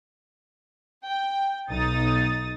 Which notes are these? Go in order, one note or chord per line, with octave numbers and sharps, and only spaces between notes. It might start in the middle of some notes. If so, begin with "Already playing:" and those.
G5
B1 D#4 D#6 A6